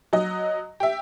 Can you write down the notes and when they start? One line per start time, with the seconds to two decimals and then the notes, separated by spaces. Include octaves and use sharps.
0.13 F#3 D#5
0.80 G4 E5